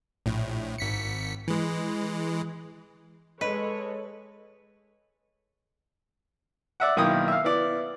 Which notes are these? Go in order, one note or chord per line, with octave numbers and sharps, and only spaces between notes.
A#1 A2
G#1 B6 C#7
E3 G#3
G#3 A4 B4 C#5 D#5
D5 E5 F#5
B1 D#3 A#3 E4 G5 D#6
E5 F5
B3 E4 D5